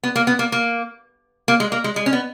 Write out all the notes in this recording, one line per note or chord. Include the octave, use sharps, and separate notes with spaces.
B3
A#3
B3
A#3
A#3
A#3
G#3
A#3
G#3
G#3
C#4
B3